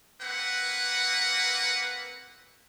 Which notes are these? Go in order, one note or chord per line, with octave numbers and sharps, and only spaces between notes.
A#3 C4 B4 F#5